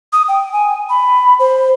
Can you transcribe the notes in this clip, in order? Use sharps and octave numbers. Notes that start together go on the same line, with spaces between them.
D#6
G5
G#5
B5
C5